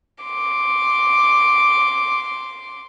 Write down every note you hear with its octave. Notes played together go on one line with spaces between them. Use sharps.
C6 D6